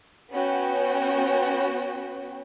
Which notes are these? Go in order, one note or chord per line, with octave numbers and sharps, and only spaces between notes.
B3 C#4 F#4 G5